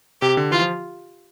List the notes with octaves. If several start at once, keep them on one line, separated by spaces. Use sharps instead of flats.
C3 G4
D3
E3 F4
F3